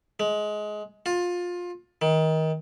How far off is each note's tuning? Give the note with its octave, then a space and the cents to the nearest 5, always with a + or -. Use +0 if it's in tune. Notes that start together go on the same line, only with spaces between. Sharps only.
G#3 +20
F4 +20
D#3 +25